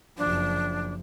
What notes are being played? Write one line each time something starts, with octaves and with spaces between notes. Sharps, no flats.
F#1 F3 D4